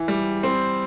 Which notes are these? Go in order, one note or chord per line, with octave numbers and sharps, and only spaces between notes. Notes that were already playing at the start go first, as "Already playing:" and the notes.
Already playing: E3
G3
C4